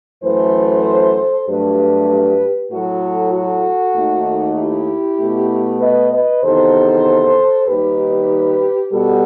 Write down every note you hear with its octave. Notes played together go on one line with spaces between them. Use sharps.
F#2 E3 A3 A4 C5
G2 F#3 A3 G4 B4
A2 F#3 A3 F#4 A4
F#4 A4
D#2 D#3 A3
E4 G4
B2 A3
B4 D#5
B4 D#5
E2 C3 D#3 A4 C5
D#2 D#3 G3 G4 B4
B2 G3 F#4 A4